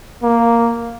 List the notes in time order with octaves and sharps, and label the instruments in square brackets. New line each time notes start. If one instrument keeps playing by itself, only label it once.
[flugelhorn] A#3